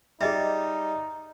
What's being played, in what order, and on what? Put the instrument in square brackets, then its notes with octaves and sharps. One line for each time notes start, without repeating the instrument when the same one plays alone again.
[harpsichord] G3 [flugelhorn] D#4 [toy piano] G#4 D#5 E5